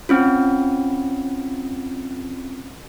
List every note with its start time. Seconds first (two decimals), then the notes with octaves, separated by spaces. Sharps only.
0.09 C4 C#4 F4